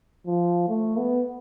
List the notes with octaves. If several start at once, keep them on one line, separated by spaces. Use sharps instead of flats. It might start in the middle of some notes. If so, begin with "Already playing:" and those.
F3
A3
B3